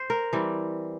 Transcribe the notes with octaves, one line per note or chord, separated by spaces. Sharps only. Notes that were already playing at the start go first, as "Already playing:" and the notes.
Already playing: C5
A#4
E3 G3 C4